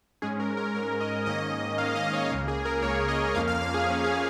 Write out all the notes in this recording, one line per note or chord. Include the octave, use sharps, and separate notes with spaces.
G#2 G#3 C#4 G#4
A#4
A#4
G#2 G#3 C#4 A#4
D#5
G#2 D#3 A#3 C#4 D#5
G#2 D#3 A#3 C#4 F5
D#5
C#5
C#2 C#3 A#3
G#4
A#4
C#2 C#3 A#3 C#5
D#5
F2 F3 A#3 C#4 F5
F5
F5
G#4
F2 F3 A#3 C#4 G#4
G#4